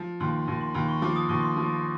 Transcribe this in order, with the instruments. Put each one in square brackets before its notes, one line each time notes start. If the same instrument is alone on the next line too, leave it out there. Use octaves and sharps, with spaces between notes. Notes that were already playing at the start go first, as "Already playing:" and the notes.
Already playing: [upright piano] F3
[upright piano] D#2 [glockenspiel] C6
[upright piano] D#2
[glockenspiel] C6
[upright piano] D#2 [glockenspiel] B5
[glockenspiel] C#6
[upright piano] F3 [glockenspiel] D6
[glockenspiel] D#6
[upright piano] D#2 [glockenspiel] C#6
[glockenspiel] C6
[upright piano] F3